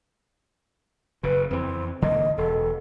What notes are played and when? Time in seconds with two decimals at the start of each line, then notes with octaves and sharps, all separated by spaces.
1.23 F#1 C#3 B4
1.51 F2 E3 C4
2.02 D3 E3 A#3 D#5
2.38 E1 A4